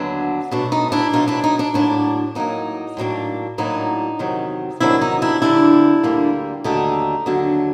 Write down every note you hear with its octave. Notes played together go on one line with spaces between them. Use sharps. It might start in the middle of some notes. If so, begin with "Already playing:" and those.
Already playing: D#2 D3 F#3 B3 D4
B2 F#3 A3 D4
D#4
D4 E4
B2 F#3 A3 D#4 F4
D4 E4
D#4
D4
A2 F#3 A#3 D4
A2 F#3 A#3 D#4
A2 F#3 A#3 D4
A2 F#3 A#3 D4 D#4
E2 C3 D#3 F#3
E2 C3 D#3 F#3 D4 E4
D#4
D4 E4
D2 D3 G3 A#3 D4 E4
D2 D3 G3 A#3
D#2 D3 F#3 A3 D4 D#4
D#2 D3 F#3 A3 D4